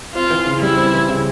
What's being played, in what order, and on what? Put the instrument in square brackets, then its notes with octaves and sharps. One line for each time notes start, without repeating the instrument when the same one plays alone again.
[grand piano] C4 [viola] F4
[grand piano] E3
C#3
[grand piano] G3 [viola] E4
[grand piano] C4
E3
C#3